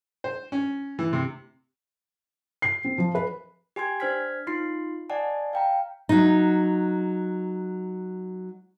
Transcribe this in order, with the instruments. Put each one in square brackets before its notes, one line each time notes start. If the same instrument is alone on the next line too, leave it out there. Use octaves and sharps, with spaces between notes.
[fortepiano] C5
C#4
E3
C3
[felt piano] C7
C4
F3
B4
[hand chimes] G4 G#5 C6 G#6
D4 C5 F6 G#6 B6
D#4 F4 C6 C7
D5 D#5 F#5 G#5 A5
F5 G5 A#5
[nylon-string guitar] F#3 D#4